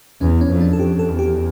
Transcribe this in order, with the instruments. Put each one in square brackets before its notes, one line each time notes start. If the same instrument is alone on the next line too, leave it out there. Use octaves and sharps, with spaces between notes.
[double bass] E2 [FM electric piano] C#4
[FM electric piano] C#4
[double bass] F2
[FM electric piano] D4
A4
[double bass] F2 [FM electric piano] G4
[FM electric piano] A4
[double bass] E2
[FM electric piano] G4